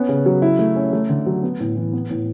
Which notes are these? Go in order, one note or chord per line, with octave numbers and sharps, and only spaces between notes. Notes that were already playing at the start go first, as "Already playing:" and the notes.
Already playing: B3 C#4
C#3
F#3
E4
A3
C#4
A3
D3
F#3
B3
A2
E3
B3
A2